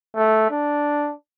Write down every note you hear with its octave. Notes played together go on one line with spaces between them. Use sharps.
A3
D4